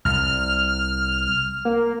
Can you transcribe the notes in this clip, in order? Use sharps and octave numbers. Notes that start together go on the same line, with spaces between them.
C2 F6
A#3